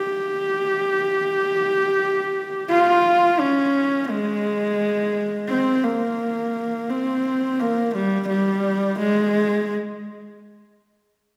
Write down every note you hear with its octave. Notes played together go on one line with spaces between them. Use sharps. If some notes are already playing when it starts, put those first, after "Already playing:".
Already playing: G4
F4
C#4
G#3
C4
A#3
C4
A#3
G3
G3
G#3